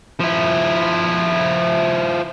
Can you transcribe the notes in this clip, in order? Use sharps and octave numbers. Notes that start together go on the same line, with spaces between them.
F3 E4